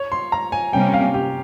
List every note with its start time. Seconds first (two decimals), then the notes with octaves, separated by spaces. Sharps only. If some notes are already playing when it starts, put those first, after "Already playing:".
Already playing: C#5
0.12 C6
0.32 A#5
0.52 G#5
0.73 C3 G3 A#3 C#4 G5
0.94 F5
1.14 G4